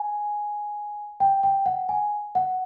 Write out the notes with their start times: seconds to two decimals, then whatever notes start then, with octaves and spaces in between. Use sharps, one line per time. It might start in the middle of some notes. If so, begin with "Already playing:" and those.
Already playing: G#5
1.20 G5
1.43 G5
1.66 F#5
1.89 G#5
2.35 F#5